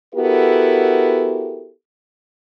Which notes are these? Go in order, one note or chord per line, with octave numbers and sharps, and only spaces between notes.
B3 E4 F#4 G4 A4 A#4